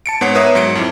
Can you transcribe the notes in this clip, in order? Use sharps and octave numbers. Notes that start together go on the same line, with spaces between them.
A5 C#7 D7
G#2 B3 B4 C#5 F#5 C7
A#4 B4 C#5 E5 A#5 D#6
G#2 F#3 C#7 D7
F2 E4